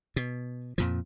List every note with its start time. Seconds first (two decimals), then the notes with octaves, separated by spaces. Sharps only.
0.16 B2
0.78 F2 A#2 F3